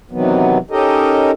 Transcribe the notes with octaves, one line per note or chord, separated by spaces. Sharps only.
C3 D#3 E3 F#3 B3
C#4 D#4 G4 A4 A#4 D#5